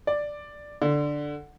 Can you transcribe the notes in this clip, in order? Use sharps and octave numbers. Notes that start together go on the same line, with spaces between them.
D5
D3